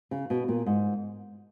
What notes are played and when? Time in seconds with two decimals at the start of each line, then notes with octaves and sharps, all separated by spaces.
0.11 C#3
0.30 B2
0.48 A#2
0.66 G#2